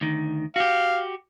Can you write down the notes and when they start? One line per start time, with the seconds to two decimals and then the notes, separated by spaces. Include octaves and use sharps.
0.01 D2 D#3
0.56 F#4 G4 F5